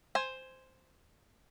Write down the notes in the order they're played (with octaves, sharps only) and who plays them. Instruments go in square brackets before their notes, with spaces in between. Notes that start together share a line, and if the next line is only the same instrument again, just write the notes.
[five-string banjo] C5 G#5